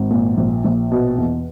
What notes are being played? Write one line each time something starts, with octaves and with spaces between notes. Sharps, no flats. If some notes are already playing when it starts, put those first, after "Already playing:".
Already playing: G#1
A#2
A#1
A#1
B2
E2